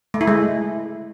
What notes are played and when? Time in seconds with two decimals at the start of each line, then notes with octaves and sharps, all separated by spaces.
0.14 A3
0.21 E4
0.27 G#3